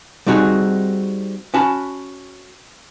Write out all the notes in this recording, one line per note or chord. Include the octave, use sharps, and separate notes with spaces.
G3 C4 D#4 F#4 G#4
C#4 F#4 A5 B5